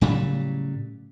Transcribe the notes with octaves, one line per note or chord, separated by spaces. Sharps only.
A2 C#3 F#3 G3